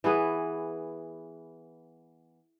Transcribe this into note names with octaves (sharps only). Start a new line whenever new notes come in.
E3 B3 G#4 B4